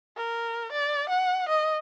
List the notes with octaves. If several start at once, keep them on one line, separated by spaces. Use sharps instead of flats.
A#4
D5
F#5
D#5